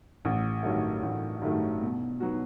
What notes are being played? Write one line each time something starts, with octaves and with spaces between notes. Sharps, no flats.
A1
G2 D#3 F#3 A3
A1
G2 D#3 F#3 A3
B2
F#3 B3 D#4 F#4